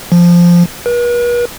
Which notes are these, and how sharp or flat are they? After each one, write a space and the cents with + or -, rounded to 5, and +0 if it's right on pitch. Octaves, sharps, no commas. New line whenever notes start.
F3 -5
B4 -45